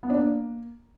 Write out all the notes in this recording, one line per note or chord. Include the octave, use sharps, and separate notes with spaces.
B3
D4
A#3